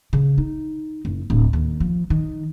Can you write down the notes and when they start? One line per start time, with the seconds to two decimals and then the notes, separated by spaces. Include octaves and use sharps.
0.13 C#3
0.38 D#4
1.05 F#1
1.30 D1
1.53 D#2
1.80 F3
2.10 D#3